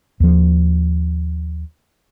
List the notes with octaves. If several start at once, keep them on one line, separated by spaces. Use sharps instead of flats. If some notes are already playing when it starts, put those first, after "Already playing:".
D#2 F3